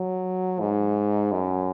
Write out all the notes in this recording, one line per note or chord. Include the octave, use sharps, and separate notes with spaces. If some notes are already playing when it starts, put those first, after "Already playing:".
Already playing: F#3
G#2
F#2